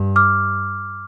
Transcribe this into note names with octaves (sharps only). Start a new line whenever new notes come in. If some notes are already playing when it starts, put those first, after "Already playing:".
Already playing: G2
D6 F6